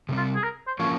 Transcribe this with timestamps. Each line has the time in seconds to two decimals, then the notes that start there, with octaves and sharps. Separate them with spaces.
0.09 C3 G3 C4
0.17 F4
0.35 G#4
0.44 A#4
0.67 C5
0.79 F3 A#3 C#4 F4 C#5